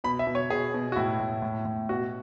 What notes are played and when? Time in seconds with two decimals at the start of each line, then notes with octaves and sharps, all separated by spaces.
0.04 B2 B5
0.19 E5
0.27 B2
0.35 C#5
0.50 B2 G#4
0.74 B2
0.92 F#4
0.96 A2 E4
1.19 A2
1.42 A2
1.65 A2
1.89 B2 F#4